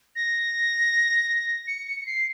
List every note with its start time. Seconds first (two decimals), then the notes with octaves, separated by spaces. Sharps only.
0.16 A#6
1.67 C#7
1.87 C#7
2.00 C#7
2.06 C7